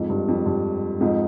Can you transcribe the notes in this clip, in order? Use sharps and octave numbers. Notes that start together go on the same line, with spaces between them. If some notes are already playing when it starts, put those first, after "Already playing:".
Already playing: F2 G#2
G2
F2
G2
F2 G#2